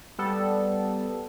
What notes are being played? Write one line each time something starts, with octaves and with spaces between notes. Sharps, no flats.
G3 B3 A4